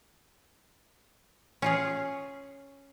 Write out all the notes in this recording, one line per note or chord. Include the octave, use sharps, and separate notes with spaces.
C#4 F4 G#4